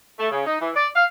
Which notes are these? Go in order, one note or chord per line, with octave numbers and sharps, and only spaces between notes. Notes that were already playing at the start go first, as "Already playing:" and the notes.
A3
C#3
D#4
E3
D5
F5